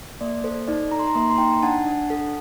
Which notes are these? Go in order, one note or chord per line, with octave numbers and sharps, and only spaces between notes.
A#3 D5
A4 C5
D#4 D5
D#4 A#5
C6
A#5
A#3 C6
A#5
C6
D#4 G5 A#5
D4 F#5 A5
D4
A4